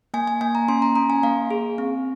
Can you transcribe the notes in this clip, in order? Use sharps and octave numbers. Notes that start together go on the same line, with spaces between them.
A#3 G#5
G#5
A#3 G#5
A#5
C#4 C6
A#5
C#4 A#5
G#5
A#3 F5
G#4
C4